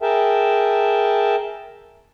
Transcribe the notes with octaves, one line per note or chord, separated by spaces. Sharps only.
G#4 A#4 E5 G5 A5